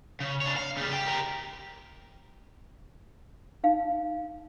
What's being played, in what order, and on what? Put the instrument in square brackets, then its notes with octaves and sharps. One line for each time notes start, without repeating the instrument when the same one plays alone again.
[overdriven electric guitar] C#3
D4 C#5
F5
C#3 G3
G4 G5
G4 A#4
[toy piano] D#4 F5